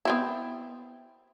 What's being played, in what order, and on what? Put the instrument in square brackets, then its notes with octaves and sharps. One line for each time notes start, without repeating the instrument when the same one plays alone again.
[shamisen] B3 C4 E4